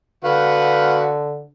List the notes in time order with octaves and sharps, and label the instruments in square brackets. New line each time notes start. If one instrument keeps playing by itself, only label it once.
[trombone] D3 [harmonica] F#4 B4 F5